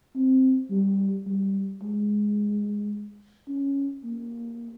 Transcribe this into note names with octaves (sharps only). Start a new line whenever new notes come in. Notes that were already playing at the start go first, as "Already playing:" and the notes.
C4
G3
G3
G#3
C#4
A#3